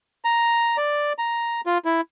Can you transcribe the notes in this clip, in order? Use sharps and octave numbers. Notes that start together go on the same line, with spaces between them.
A#5
D5
A#5
F4
E4